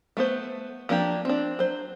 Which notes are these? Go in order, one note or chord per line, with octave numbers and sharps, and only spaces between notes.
A3 B3 C5
F3 A#3 D4 G4
C4 D4
F#3 C5